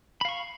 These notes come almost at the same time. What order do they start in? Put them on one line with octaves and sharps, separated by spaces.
B5 F5 C#6